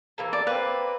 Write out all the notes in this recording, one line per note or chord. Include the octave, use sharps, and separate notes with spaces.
E3 A#3 A4
D5
A#3 C4 B4